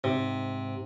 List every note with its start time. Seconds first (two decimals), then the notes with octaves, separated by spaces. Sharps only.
0.04 G#2 C3